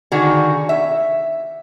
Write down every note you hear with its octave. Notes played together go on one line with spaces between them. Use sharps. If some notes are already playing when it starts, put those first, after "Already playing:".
D3 D#3 F#4 G#4
E5